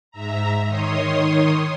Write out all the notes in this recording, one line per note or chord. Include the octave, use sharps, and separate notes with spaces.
G#2 E5 A#5
D#3 C#5 C6 D#6